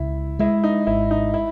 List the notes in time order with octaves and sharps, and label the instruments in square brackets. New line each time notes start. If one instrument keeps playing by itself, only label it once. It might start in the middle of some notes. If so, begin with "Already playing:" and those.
Already playing: [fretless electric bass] C#2 [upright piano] E4
[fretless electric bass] G#3 [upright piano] E4
[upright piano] D#4
[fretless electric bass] G#1 [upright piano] E4
[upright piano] D#4
E4